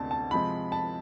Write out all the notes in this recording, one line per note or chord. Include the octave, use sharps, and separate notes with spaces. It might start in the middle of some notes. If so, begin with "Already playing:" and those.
Already playing: D2 C3 G#3 D4 A5
A5
C3 F3 G#3 B5
A5